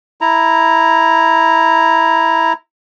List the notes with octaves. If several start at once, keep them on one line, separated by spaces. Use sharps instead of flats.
E4 A#5